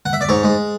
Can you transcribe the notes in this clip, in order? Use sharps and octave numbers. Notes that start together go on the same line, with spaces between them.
F#5
E5
D5
G#2 C#5
G#3